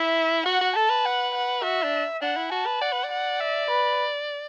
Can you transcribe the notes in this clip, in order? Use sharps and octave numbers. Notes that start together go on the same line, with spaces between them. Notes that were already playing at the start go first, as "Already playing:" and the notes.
Already playing: E4 E5
F#4 F#5
F#4
A4 A5
B4
F#5
F#5
F#4 E5
D4
D4 F#5
E4
F#4 A5
B4
D5 F#5
B4
D5
F#5
E5
B4